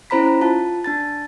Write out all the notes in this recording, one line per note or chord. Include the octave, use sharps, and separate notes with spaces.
C#4 E4 C5 A#5 B5 B6
F4 A5
D4 A5 A6